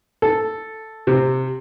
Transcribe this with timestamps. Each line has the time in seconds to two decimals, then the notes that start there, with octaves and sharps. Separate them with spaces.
0.22 A4
1.07 C3